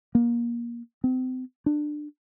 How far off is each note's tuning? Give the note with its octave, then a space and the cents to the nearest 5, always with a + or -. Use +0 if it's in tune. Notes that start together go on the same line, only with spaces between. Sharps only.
A#3 +25
C4 -35
D4 +20